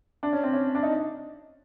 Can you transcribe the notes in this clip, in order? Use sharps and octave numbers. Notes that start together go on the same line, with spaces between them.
D4
C#4
C4
C#4
D4
D#4